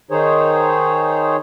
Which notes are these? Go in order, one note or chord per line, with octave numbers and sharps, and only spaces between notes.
D#3 D#4 G#4 C5 C#5